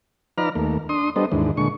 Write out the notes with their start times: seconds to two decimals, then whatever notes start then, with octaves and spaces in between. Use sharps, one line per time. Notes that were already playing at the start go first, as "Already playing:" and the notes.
0.38 F3 D#4 B4 D5 A#5 F6
0.55 D#2 A3 A#3
0.89 D4 C6 D#6
1.16 G3 B3 D4 A4 C5 D#5
1.32 D#2 G#2 E3 D4
1.57 A#2 D3 G#3 C#6